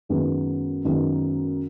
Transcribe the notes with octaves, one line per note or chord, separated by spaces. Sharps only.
F#2 D#3 G#3 B3
F#2 D#3 G#3 B3